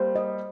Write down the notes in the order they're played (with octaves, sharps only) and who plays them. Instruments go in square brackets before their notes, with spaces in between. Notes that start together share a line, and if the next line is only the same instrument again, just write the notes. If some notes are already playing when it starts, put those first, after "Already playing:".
Already playing: [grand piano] G3 A#3 [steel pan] C5
[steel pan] D#5